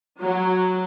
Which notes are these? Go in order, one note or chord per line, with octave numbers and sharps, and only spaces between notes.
F#3